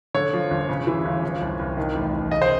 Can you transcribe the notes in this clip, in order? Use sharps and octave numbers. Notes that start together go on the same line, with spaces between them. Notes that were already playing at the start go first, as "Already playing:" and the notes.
D3 C#5
F3
G1
C#3
E3
G1
F3
C2
C2
D#3
A1
A1
C#3 D#5
C5